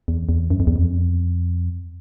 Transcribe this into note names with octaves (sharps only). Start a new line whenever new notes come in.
E2
E2
F#2
F2
E2
F2